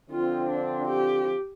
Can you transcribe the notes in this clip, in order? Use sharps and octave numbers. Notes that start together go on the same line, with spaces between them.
D3 F3 C4 F4
D4
G4